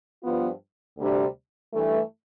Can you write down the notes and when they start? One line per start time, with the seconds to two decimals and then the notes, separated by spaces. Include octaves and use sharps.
0.23 G2 F3 B3 F4
0.98 D2 C3 G3 D4
1.74 G2 E3 A3